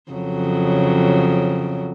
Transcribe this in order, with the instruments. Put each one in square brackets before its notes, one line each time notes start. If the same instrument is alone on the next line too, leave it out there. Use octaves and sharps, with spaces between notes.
[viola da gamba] F2 C#3 F#3